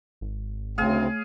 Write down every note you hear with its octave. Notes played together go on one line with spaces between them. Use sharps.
G#1
D2 C#3 A3 C4 G#4 C#5 F5